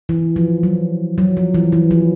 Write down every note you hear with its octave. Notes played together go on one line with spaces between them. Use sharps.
E3
F3
F#3
F#3
F3
E3
E3
F3